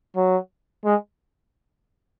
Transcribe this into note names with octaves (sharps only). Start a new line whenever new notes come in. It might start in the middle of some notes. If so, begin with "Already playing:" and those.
F#3
G#3